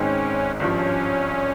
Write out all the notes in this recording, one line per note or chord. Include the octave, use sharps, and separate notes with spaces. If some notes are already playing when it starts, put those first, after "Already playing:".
Already playing: G#1 G#2 D#3 G#3 C4 C#4
G#1 G2 F3 C#4